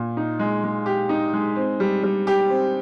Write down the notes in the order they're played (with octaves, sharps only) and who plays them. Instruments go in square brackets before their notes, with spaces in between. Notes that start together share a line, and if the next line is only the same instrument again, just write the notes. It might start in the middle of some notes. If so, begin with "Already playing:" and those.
Already playing: [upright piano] A#2
D#4
G#3
G#3
G4
D#4
G#3
C4
G3
G3
G4
C4